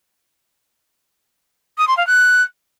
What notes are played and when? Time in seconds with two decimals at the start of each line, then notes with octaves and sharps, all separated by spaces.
1.78 D#6
1.87 C6
1.97 F5
2.07 F#6